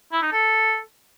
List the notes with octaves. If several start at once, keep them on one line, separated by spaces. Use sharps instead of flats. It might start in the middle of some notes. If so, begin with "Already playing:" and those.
E4
D#4
A4